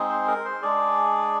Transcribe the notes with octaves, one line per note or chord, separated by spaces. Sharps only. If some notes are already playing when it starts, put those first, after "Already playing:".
Already playing: G#3 C4 D#4 G#4
C5
A#4
C5
G#3 D4 G#4 D5